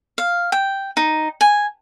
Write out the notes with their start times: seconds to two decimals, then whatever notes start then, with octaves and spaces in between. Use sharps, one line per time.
0.18 F5
0.52 G5
0.97 D#4
1.41 G#5